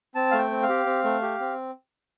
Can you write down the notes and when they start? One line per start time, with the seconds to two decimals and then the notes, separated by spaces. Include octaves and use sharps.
0.15 C4 A5
0.31 A3 F5
0.39 G5
0.51 C4
0.63 F5
0.69 G4
0.86 C4
1.04 A3
1.22 G4
1.40 C4